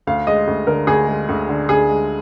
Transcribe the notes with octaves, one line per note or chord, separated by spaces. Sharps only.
D2 F5
G#3 D#5
D2
D3 A#4
D2 G#4
G#3
D2
D3
D2 G#4
G#3